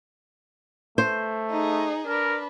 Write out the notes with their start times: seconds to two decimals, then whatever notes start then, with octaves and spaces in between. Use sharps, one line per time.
0.98 A3 C5
1.50 D#4 G#4
2.07 D4 A#4 B4